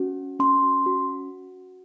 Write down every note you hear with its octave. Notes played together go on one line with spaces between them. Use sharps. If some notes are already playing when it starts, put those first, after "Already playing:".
Already playing: C#4 F#4
C#4 C6
F#4